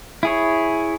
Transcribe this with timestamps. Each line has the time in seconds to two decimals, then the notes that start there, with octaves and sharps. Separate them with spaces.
0.23 E4 G#4 C#5